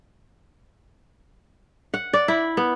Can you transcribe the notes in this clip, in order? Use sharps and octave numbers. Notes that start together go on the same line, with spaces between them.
F#5
D5
E4
B3